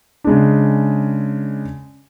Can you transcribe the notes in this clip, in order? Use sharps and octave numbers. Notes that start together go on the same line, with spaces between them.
C#3 G#3 D4